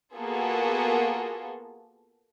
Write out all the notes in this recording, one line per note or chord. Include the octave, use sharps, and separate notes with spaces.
A#3 B3 F4 F#4 G#4 A4